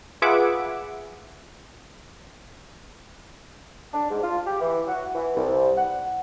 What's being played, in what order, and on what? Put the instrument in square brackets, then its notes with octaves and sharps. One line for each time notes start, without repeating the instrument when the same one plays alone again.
[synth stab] F4 G#4 B4 E5 F#5 D6
[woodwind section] D4
G#2
F4
G4
E3
F#4
E3
C2
F#5